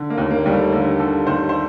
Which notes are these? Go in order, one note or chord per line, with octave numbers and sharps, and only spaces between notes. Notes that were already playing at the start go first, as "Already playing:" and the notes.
Already playing: D3
A#3
D#2
A#3
D#2 G3
A3
D3 A#3
D3 A4
D#2 C5
C5